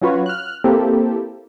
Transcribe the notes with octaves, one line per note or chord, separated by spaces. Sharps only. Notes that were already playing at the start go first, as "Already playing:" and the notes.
F#3 C#4 F4 F#4 B4 C#5
F6 F#6
A#3 C4 E4 G4 A4